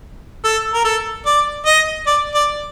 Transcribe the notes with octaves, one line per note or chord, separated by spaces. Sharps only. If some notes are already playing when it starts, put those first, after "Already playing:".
A4
A#4
A4
D5
D#5
D5
D5